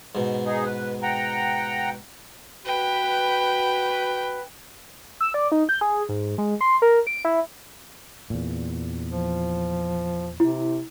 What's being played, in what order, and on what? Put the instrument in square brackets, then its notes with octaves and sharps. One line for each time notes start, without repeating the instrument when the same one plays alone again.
[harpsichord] G#2 B2
[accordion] D#4 G#4
B4
F#5 G5 A#5
[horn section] F#4 B4 [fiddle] G5
[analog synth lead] E6
D5
D#4
G6
G#4
G#2
G#3
C6
A#4
D7
E4
[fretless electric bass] E2 A#2
[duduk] F3
[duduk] C3 [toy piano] E4